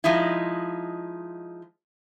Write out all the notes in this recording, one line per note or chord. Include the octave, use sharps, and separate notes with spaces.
F3 G#3 D#4 E4